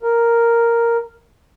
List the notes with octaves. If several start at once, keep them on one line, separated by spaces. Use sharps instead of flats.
A#4